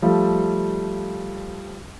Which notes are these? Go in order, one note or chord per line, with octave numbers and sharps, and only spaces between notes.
F3 G3 A3